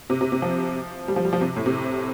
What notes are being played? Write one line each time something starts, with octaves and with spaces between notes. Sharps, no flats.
C3
C3
C3
F3
G3
F3
G3
F3
C3
A2
C3